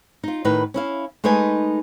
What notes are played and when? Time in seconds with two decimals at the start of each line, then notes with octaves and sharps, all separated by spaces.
0.23 D#4 F4
0.45 A2 D#3 D#4 B4
0.74 C#4 E4 F5
1.24 G#3 A3 D#4 B4 D#5 G#5